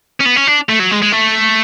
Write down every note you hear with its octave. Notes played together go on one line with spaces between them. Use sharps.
C#4
B3
C#4
D4
A3
F#3
G#3
G#3
A3